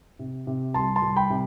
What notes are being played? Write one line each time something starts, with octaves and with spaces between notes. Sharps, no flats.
C3
C3
C2 A5 C6
A5 C6
C2
G5 B5
C3